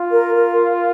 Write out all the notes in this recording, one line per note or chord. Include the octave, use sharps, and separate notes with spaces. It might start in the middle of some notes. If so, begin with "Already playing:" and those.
Already playing: F4
A#4
A#4